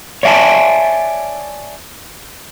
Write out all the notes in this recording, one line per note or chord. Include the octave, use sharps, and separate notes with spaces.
C#5 D5 E5 F#5 G#5 A5